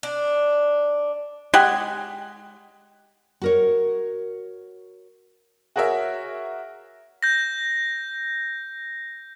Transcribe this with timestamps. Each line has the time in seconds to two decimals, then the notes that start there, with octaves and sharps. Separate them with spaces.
0.03 D4
1.54 G#3 G4 F#5 G#5
3.42 F#4 A#4 C#5
5.76 F#4 G#4 A#4 C#5 E5
7.23 G6 A#6